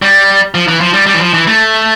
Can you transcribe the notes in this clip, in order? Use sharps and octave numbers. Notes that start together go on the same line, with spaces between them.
G3
F3
E3
F3
G3
G3
E3
F3
E3
A3